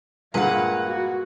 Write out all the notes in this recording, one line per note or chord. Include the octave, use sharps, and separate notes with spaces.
G2 A#2 G#3 A#3 B4 F5 F#5
F#4